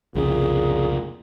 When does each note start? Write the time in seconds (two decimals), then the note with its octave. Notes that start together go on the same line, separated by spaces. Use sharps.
0.15 C2 F2 A#2 C#3 G#4